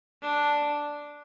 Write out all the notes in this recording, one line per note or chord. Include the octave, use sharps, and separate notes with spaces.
D4